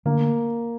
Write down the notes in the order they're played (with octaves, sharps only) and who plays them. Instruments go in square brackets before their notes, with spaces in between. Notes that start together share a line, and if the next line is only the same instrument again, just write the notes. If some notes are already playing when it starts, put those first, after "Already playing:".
[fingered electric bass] D3 A3 D4 [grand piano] A#3